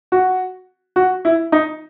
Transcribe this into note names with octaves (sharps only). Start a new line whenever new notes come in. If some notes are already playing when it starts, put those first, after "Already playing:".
F#4
F#4
E4
D#4